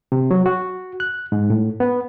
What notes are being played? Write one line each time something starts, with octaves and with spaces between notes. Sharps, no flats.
C3
F#3
F#4
F#6
G#2
A2
B3